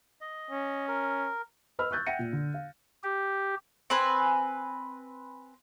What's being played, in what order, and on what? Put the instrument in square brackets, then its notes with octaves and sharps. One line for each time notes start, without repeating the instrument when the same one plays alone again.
[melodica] D#5
[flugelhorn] C#4
[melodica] A#4
[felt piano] B4 D#5 B5 E6 F6
C#6 E6 F#6 G6 A6
E5 F#5 G5 A#6 C#7 D#7
A#2
D3
F5
[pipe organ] G4
[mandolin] C4 B4 G#5